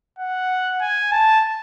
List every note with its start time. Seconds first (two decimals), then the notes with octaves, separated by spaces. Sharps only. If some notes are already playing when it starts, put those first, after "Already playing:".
0.19 F#5
0.81 G#5
1.12 A5